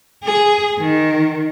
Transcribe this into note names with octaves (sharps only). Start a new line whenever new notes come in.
G#4
D#3